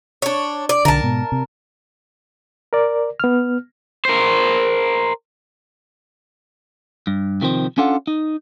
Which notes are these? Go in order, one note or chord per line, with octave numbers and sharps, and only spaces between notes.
D4 C#5
D5
B1 D3 A#4 A5
G#2 B2
C3
A#4 D5
B3 F6
A#4 C5
G2
C3 D#3 F3 C4
C#4 D4 F4 A4 F#5
D#4